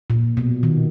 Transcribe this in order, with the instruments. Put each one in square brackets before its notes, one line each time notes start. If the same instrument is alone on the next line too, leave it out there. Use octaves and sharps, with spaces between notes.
[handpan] A#2
B2
D#3